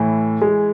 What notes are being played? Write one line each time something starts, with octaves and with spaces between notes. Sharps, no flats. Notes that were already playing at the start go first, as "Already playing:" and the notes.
Already playing: A2 E3
G#3